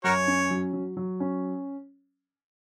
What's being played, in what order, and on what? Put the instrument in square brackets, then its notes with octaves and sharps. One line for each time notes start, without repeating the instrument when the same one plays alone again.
[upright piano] F#2 [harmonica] F#4 A#4 C#5
[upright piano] C#4
F#3
F#3
F#3
C#4